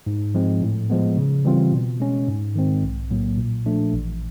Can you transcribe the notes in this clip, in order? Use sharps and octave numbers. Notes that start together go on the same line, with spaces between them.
G#2
F3 G#3 C4
A2
F3 G#3 B3
C#3
E3 G3 C4 F4
B2
G#3 C#4
G#2
D#3 G#3 C4
B1
A2 F#3 A#3
A#2
F3 A3 D4
A1